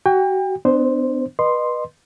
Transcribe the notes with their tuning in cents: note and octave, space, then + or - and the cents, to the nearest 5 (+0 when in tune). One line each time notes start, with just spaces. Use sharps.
F#4 +35 G5 +35
B3 +45 D4 +20 C5 +0
B4 -20 D#5 -30 C6 +0